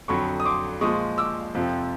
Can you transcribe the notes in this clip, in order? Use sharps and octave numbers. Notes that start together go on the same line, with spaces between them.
F2 D3 F#3 B5 C#6
D#6
C6 D6
A#2 F3 G#3 C#6 D#6
D6 E6
F2 C3 F3